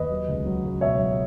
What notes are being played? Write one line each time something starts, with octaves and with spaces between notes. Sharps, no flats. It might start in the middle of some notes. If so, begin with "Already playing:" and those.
Already playing: D#2 B4 D#5
F#3
C#2
F#3
C#2
B2 C#5 E5
F#3